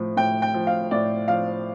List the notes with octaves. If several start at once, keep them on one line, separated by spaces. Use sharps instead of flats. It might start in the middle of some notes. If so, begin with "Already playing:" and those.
Already playing: A2 F3
A2 G5
G5
F3
F5
A2 D5
F3 F5